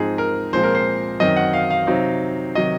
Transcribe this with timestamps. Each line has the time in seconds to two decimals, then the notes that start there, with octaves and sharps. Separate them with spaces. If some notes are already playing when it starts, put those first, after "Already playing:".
Already playing: G#2 F3 C4 D#4 G#4
0.18 A#4
0.53 A#2 F3 G#3 C4 C5
0.64 A#4
0.75 C5
1.20 F#2 D#3 F#3 C4 D#5
1.36 F#5
1.53 F5
1.70 F5
1.87 C3 F#3 C4 D#4
2.55 C3 D#3 F#3 D#5